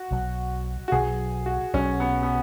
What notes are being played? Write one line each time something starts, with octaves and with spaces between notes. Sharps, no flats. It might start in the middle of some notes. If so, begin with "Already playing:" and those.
Already playing: F#4
B1 B2 F#3
F#4
B1 B2 F#3 G#4
F#4
B1 B2 F#3 C#4
B3
B3